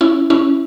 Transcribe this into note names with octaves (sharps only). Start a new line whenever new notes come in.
C#4 E4
C#4 E4